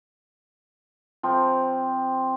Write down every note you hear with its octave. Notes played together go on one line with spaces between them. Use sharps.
F3 C4